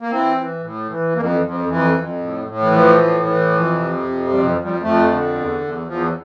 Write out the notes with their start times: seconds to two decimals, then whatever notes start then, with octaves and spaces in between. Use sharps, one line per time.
0.01 A#3
0.11 E3 C4
0.37 E3
0.63 A2
0.89 E3
1.16 F2 A#3
1.33 E3
1.42 F2
1.51 F3
1.68 F2 E3
1.94 F2
2.21 A2
2.47 A2
2.62 E3
2.73 E3 F3
2.99 A2
3.25 E3
3.51 F2
3.78 C3
4.04 F2
4.30 F2 G3
4.47 F3
4.57 F2
4.64 G3
4.82 F2 A3
5.09 D3
5.35 E2
5.61 E2
5.87 E2 F3